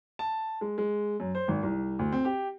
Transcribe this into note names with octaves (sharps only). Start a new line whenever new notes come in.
A5
G#3
G#3
F#2
C5
G#1
C2
D2
C4
G4